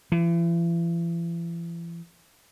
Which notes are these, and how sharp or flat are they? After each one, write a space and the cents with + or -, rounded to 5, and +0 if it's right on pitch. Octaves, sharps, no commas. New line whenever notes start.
E3 +40